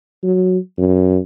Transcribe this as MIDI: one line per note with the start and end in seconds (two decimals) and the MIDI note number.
0.23 0.58 54
0.78 1.18 42